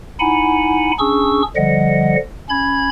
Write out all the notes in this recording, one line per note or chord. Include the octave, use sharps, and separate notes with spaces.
D#4 E4 F#5 G#5 B5
C#4 D4 G#4 C#6 E6
D3 F3 G3 D#5 F#5
C#4 B5 G#6